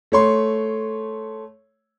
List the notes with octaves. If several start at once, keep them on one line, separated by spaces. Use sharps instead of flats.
A3 C#5 C6